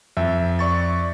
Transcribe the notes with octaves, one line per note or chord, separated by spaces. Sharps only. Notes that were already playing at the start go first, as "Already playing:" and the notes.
F2 E5
D5 C#6 A6